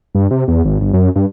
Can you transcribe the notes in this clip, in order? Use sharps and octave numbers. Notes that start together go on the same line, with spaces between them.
G2
C3
E2
G#1
G1
F#2
G2